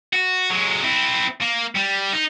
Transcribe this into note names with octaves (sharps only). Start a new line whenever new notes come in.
F#4
F#3 G#3
C4 E4
A#3
G3
D#4